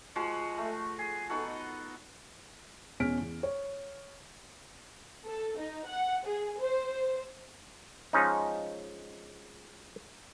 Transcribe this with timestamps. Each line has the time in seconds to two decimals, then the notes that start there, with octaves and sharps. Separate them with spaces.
0.16 F3 G#3 F#4
0.58 A3
0.99 G#4
1.30 B3 D#4 F#4 A4
1.48 D#5
3.00 E2 B2 C#4 F6 B6 D7
3.21 E2
3.43 C#5
5.26 A4
5.58 D#4
5.87 F#5
6.25 G#4
6.60 C5
8.13 F3 G#3 C#4 D#4